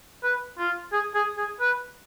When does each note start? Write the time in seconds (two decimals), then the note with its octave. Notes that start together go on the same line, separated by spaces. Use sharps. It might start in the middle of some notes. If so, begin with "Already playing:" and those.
0.23 B4
0.58 F4
0.92 G#4
1.15 G#4
1.37 G#4
1.61 B4